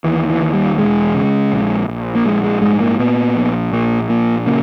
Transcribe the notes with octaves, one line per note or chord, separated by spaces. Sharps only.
D#2 E3
E3
D#2
G3
E1 G#3
C#3
A#1
A#1
A#3
A#1 G#3
G#3
G#2 G#3
A#3
A#2 B3
A#1
A#2 A#3
A#1 A#3
C#3 A#3